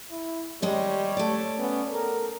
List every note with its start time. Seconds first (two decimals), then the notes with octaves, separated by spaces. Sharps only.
0.11 E4
0.62 D#2 G3 G#3 C#5 D#5
1.17 A3 D5
1.59 B3 C#4
1.92 A4 A#4